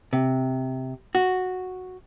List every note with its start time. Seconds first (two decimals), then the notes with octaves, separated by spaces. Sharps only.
0.13 C3
1.15 F#4